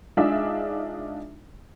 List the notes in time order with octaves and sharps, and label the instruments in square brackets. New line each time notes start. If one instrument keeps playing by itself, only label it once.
[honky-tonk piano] G#3 D4 D#4 F4 G#4 E5